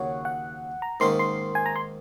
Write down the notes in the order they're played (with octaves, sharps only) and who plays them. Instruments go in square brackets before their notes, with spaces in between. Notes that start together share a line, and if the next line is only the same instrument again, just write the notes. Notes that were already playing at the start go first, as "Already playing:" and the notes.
Already playing: [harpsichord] D#2 C#3 F#3 [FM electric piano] C#5 F#5
[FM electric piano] F#5
A#5
[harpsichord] G#2 D#3 A#3 C#4 [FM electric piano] C6
[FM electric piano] C6
G#5
A#5
C6